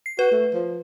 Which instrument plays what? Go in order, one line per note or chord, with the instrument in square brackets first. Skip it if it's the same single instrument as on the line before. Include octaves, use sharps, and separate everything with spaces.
[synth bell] C7
[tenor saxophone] F#4 [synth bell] B4
[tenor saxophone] A3
F3